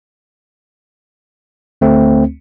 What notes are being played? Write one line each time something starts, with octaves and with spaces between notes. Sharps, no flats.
D2 A3 C4